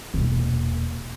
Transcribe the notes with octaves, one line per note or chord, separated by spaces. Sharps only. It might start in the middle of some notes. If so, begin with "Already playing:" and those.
E1 A#2